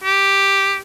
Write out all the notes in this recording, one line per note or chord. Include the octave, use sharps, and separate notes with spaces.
G4